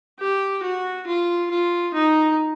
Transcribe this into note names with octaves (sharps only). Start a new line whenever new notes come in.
G4
F#4
F4
F4
D#4